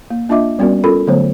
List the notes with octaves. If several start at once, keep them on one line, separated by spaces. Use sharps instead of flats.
A#3
A#3 D4 F4 D#5 E5 D6
G3 B3 C#4 F#4 A#4 D5
C#4 F4 A4 A#4 B5
D3 F#3 A3 B3 C5 C#5